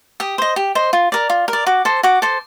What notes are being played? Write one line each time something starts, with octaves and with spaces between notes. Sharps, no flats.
G4 D#6
C5 D#5
G4
C5 D#5
F4
A#4 D5
F4
A#4
D5
F#4 D6
A4 C5
F#4 D6
A4 C5